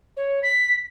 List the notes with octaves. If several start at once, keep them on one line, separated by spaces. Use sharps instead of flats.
C#5
B6